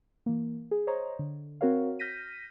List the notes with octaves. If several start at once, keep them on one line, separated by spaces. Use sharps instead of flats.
E3 A#3
G#4
C5 C#5 D#5 A#5
D3
C4 F#4 A#4 C#5 F5
F6 G6 A#6 B6 D#7